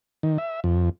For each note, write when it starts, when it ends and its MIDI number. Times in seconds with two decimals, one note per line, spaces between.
0.23 0.38 51
0.38 0.60 76
0.64 0.89 41